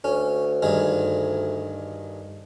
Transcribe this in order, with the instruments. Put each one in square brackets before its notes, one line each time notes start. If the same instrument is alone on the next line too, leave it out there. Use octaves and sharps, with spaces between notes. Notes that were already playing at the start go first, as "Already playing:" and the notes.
[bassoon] D2 [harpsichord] C#4
[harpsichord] G2 D#3 G#4